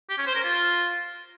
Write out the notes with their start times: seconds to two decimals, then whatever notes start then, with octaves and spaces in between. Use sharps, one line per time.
0.09 G4
0.18 C#4
0.27 C5
0.35 A#4
0.44 F4